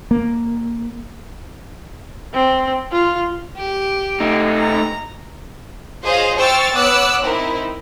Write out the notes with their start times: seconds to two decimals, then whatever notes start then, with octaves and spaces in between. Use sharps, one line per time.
0.11 A#3
2.34 C4
2.92 F4
3.57 G4
4.20 A3 D#4
4.56 A#5
6.03 F4 G#4 C5 C#5 D#5 F5
6.37 C5 G5 C#6 E6 F6 A6
6.74 B3 C#5 D6 E6 F#6
7.23 C4 D#4 E4 A#4